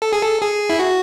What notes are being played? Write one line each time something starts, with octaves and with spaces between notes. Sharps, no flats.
A4
G#4
A4
G#4
E4
F#4